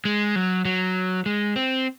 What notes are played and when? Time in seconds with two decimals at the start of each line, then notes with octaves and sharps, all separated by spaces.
0.05 G#3
0.36 F#3
0.65 F#3
1.26 G#3
1.56 C4